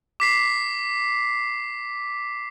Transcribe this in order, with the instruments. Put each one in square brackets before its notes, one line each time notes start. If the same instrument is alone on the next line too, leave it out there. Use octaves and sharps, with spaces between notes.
[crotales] D6 B6 C7